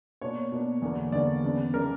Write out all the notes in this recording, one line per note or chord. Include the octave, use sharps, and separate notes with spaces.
B2 A#3 D4 C#5
B2 A#3 D4
E2 D3 A#3 D4
E2 D3 A#3 D4 D5
C#3 E3 B3 D4
C#3 E3 B3 D4 A#4